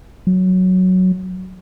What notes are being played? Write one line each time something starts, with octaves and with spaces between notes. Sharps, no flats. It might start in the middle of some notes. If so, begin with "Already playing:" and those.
F#3